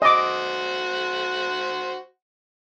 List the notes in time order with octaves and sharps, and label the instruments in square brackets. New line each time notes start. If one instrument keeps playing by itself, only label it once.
[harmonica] F#4 C5 [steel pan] D#5 D6